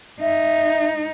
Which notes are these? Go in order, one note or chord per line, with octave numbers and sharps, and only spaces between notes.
D#4 E5